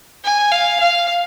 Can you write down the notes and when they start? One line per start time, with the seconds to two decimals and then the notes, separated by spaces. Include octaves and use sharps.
0.24 G#5
0.51 F5
0.80 F5